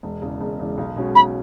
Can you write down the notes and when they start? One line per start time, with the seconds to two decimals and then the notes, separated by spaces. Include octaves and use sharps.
0.03 E1
0.22 E2 C#3
0.41 E1
0.59 E2 C#3
0.78 B1
0.96 B2 G#3 C#4 F#4
1.15 B1 B5